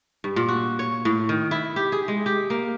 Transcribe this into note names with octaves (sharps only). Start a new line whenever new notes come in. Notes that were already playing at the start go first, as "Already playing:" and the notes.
G2
A#2
F#4
C#5
A2
D#3
E4
G4
G#4
G#3
G4
A#3